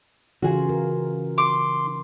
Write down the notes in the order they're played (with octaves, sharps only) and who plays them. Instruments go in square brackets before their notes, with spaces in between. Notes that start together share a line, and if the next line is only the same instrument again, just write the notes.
[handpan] C#3 E3 F4 [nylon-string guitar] F#4 G#4
[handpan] A#4
[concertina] C6 [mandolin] D6